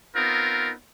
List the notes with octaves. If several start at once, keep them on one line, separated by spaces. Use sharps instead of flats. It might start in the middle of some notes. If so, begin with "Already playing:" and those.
B3 C4 D#4 F4 A#4